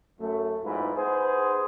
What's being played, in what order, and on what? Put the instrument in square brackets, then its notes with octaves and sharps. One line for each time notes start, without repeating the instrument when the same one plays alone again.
[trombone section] F#2 A3
E2 G#2 F#3 E4 F4 B4
B3 D#4 G#4 B4 C5